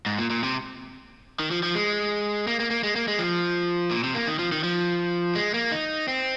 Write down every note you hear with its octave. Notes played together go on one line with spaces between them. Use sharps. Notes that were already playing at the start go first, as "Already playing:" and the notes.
G#2
A#2
A#2
C3
D#3
F3
F3
G#3
A#3
A#3
A#3
G#3
A#3
G#3
F3
A#2
C3
A#3
D#3
F3
D#3
F3
G#3
A#3
D#4
C4